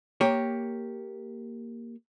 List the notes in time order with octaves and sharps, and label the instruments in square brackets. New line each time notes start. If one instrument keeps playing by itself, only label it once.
[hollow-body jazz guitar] A#3 G4 C#5